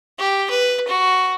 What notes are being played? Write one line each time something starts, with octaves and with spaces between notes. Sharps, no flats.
G4
B4
F#4